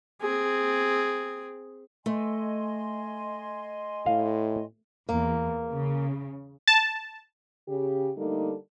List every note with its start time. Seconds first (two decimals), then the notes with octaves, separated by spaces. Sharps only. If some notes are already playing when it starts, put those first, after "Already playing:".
0.21 C4 G#4
2.06 A3 D#5 G#5 C6
4.06 A2 F5
5.09 E2 A#3
5.71 C#3
6.68 A5
7.68 C#3 G4
8.16 D3 G3 A3 A#3 D#4 A4